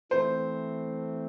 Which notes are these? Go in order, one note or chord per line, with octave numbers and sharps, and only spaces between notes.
E3 A3 C4 C5